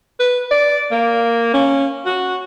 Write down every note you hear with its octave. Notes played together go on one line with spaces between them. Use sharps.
B4
D5
A#3
C#4
F#4